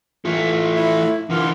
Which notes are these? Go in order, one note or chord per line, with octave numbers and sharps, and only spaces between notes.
E3 A3 F4
E4
D3 E3 F4